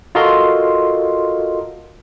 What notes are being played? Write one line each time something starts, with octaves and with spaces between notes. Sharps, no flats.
F4 F#4 A4 A#4 D#5 C6